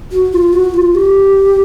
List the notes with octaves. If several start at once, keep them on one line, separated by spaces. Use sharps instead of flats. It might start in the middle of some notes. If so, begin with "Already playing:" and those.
F#4
F4
F#4
F4
G4